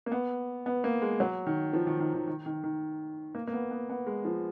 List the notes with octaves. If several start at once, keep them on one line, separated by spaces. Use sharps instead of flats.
A#3
B3
B3
A#3
G#3
F#3
D#3
F3
D#3
D#3
D#3
D#3
D#3
D#3
A#3
A#3
B3
B3
B3
G#3
F3